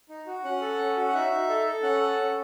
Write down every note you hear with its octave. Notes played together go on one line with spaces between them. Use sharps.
D#4
F#4
C#4 F#5
A4
C#4
F#4
F#5
D#4 E5
D#4
A4
A4
C#4 F#5
A4
C#4